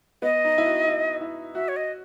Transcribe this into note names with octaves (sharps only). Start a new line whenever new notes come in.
B3 D#5
D#4
E4
F#4
E4
E4
F#4 E5
C#5
D#5